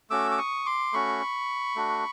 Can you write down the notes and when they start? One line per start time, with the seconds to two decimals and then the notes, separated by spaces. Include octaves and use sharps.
0.10 A3 C#4 F#4 D6 E6
0.31 D6
0.38 C#6 D#6
0.65 C6 D6
0.93 A3 C#4 F#4 B5 C#6
1.76 A3 D4 F#4